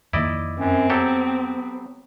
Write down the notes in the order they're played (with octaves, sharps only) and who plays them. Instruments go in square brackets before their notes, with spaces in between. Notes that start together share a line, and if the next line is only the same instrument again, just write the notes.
[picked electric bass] F2 D#3 A#3 [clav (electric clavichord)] E4 D5 D#5
[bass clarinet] F#2 [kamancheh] C4
[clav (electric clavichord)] F#3 G4 A4 [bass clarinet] B3